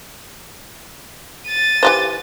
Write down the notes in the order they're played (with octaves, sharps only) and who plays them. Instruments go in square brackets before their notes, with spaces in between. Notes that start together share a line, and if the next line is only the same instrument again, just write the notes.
[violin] A6 D#7
[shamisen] E3 G4 C5